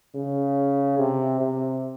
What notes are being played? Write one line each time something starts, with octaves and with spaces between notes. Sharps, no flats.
C#3
C3
C3